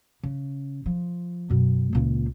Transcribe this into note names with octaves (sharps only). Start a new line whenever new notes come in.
C#3
F3
F#2 B2
C#2 A#2